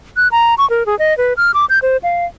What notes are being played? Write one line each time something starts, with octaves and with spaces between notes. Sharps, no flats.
F#6
A#5
C#6
A#4
G#4
D#5
B4
F6
D6
G6
C5
F5